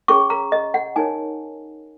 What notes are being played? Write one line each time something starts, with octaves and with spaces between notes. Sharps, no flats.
C#4 G#4 C#5 C#6
A#5
D#5
F#5
D#4 A#4 C#5 G#5